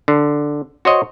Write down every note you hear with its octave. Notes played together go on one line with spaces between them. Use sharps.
D3
F#4 C5 C#5 D#5